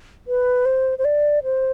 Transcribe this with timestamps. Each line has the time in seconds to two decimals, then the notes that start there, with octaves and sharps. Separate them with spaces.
0.28 B4
0.66 C5
0.98 C5
1.05 D5
1.43 C5